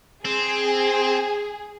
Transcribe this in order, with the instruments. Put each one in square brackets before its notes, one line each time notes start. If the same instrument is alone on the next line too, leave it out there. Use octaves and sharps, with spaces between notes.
[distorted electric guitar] C4 [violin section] G#4